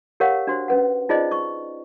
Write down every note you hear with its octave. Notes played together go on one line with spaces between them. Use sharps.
G4 A#4 C#5 F5 F#5
D4 F#4 C5
C#4 B4 F#5
D#4 F4 G#4 C5 D5 D#5
C#6